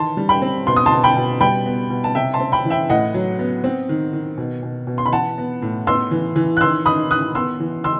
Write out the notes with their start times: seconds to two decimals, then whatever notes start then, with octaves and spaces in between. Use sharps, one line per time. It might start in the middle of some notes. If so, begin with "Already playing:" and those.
Already playing: D#3 E3 A5 C6
0.17 G3
0.29 G5 B5
0.42 C4
0.67 B2 C6
0.76 D#6
0.86 A5 C6
0.91 B2
1.04 G5 B5
1.16 B2
1.41 G3 G5 B5
1.66 B3
1.90 B2
2.04 A5
2.15 C3 E5 G5
2.33 A5 C6
2.40 C4
2.52 G5 B5
2.65 E3
2.70 E5 G5
2.90 A2 D#5 F#5
3.14 F#3
3.39 B3
3.64 C4
3.89 D#3
4.13 D#3
4.38 B2
4.63 B2
4.87 B2
4.98 C6
5.06 B5
5.12 E3 F#5 A5
5.38 B3
5.62 A2
5.87 B3 C6 E6
6.11 E3
6.36 E3
6.57 F#6
6.60 D#3 C6 E6
6.86 D#3 B5 D#6
7.10 D#3 D#6 F#6
7.35 B3 C6 E6
7.60 E3
7.84 E3 C6 E6